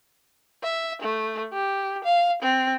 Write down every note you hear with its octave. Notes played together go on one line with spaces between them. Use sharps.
E5
A3
G4
F5
C4